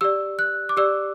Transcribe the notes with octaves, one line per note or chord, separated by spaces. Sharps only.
G4 D5 E6
F#6
D6
G4 D5 E6